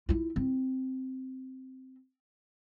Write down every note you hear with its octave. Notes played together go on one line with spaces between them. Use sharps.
E4 F4
C4